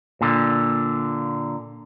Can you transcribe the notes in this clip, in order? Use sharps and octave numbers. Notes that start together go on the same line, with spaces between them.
A#2 D3